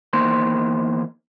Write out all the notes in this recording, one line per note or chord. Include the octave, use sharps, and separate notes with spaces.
E2 A#3 D#4 C5 C6